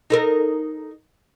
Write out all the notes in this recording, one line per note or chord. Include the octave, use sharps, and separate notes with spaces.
D#4 A4 A#4